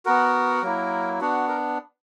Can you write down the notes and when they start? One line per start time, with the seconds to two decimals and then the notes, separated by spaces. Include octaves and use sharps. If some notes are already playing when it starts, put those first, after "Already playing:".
0.05 B3 F#4 A#4
0.62 F#3 A#3 E4
1.21 B3 D4 F#4
1.48 A#4